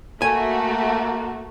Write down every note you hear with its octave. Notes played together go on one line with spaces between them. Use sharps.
A3 A#3 F#4 G#5